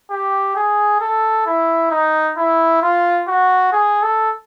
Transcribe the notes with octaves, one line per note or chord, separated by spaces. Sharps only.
G4
G#4
A4
E4
D#4
E4
F4
F#4
G#4
A4